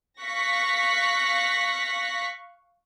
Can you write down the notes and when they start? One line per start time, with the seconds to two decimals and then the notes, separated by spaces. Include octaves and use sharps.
0.21 F5 C#6 F#6 A#6 B6